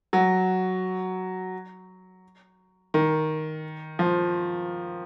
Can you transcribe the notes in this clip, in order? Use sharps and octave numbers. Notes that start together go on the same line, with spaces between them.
F#3
D#3
F3